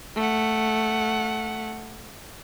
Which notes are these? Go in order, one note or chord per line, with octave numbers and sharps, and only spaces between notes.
A3 F#5